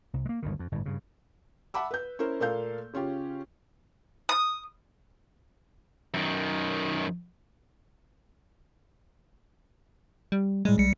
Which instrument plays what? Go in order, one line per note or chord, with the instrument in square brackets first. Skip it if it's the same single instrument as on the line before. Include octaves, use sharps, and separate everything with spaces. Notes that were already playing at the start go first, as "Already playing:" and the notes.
[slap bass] C2
G#3 A#3
G1 D2 D#3
F2
G1 A2
G2 C#3
[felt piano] E5 F#5 A5 B5 D6 E6
B4 G6
C#4 E4 A#4 C5
A#2 A3 A#3 A4 F5 G6
C#3 C#4 F4 G4
[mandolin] D#6
[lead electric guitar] F#2 D#3
[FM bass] G3
[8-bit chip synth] A2 G3 [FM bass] G#3
[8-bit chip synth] B1 G3 C#7